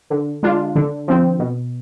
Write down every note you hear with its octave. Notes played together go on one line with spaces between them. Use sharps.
D3
G#3 D4 F4
D3
F3 C4
B2